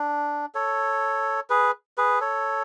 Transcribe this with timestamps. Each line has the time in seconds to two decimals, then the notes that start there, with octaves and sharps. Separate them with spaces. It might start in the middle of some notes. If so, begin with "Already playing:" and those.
Already playing: D4
0.55 A4 C#5
1.50 G#4 B4
1.98 G#4 B4
2.20 A4 C#5